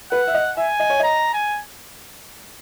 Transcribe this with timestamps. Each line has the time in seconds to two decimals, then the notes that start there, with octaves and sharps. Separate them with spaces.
0.12 B4 F#5
0.27 E5
0.34 D#5
0.57 E5 G#5
0.80 D#5
0.90 C#5
1.00 D#5 A#5
1.34 G#5